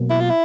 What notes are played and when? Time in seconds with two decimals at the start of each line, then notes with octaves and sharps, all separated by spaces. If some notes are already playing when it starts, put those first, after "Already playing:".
Already playing: B2 F#3 A#3
0.10 E4
0.20 F4
0.29 E4